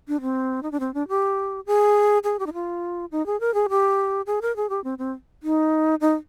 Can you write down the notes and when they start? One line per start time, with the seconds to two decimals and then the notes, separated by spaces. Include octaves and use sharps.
0.08 D4
0.22 C4
0.63 D#4
0.72 D4
0.80 C4
0.94 D4
1.08 G4
1.66 G#4
2.24 G#4
2.39 G4
2.47 D#4
2.53 F4
3.12 D#4
3.26 G#4
3.40 A#4
3.54 G#4
3.70 G4
4.27 G#4
4.42 A#4
4.56 G#4
4.70 G4
4.84 C4
4.98 C4
5.43 D#4
6.01 D#4